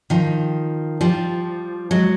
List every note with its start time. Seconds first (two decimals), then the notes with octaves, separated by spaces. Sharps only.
0.10 D#3 F3
1.01 F3 G3
1.91 F#3 G#3